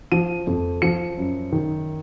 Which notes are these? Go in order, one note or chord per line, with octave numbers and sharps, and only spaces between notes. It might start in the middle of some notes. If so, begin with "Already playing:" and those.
F3 D#7
F2
F3 C#7
F#2
D#3